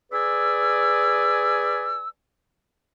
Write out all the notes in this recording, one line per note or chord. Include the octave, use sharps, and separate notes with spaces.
G#4 B4 D5 G#5 E6